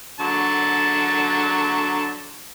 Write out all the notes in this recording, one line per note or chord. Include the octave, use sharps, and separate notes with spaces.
D3 F#3 A5